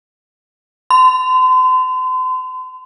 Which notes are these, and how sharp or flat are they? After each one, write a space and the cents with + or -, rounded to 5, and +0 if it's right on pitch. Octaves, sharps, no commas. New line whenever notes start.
C6 -40